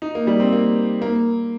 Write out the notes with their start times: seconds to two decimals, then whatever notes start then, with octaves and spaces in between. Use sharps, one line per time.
0.02 D#4
0.15 A#3
0.27 G3
0.40 C4
0.52 A#3
1.02 A#3